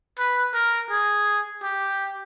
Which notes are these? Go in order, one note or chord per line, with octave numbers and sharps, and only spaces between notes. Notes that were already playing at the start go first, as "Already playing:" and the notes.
B4
A#4
G#4
G4